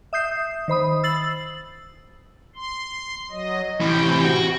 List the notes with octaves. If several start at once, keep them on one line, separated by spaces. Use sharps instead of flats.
E5 D#6 G6 C7
D#3 C5 B5 D#6
E6 A6 C7 F#7
C6
F#3 D#5
A2 C3 E3 G5
F#4